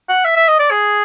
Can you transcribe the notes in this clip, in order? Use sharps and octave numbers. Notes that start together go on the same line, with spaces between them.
F#5
E5
E5
D#5
D5
G#4